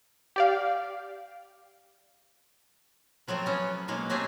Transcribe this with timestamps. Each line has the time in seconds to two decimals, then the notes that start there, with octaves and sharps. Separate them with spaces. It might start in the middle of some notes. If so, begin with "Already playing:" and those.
0.36 G4 D5 F5
3.28 F3 F#3 A3 C4
3.46 B3 C#4
3.88 B2 F#3 G#3 A#3
4.10 F#3 A3 C4 G4 G#4